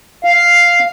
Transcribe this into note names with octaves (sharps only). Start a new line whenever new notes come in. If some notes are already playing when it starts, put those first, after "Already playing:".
F5